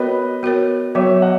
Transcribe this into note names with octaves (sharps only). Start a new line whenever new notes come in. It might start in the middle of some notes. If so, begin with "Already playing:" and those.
Already playing: B3 F#4 A#4 B4 C#5 D#5
B3 F#4 A#4 C#5
F#3 B3 F#4 C#5 E5
D#5 F#5